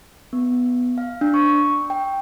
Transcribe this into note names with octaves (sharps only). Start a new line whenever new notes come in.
B3
F5
D4
C#6
G5